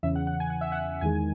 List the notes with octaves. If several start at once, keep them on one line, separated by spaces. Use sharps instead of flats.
E2 C#3 E3 E5
F#5
F#5
G#5
F#5
E5
F#5
E2 D#3 G#3 G#5